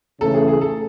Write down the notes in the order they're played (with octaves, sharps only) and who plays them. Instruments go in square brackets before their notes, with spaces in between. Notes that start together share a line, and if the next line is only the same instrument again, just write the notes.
[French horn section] C#3 E3 A3 C#4 [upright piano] A4
[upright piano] G#4
G#4
A4